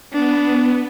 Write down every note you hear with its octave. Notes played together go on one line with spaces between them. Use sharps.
B3 D4